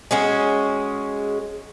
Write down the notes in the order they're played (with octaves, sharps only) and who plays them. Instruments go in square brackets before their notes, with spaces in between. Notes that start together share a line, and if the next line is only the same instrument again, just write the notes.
[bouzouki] G#3 C#4 F#4 G#4